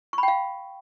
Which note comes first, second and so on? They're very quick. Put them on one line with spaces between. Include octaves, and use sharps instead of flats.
C#6 B5 G5 F5